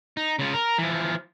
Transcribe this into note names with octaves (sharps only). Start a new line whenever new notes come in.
D#4
C#3 F4
A#4
E3 F3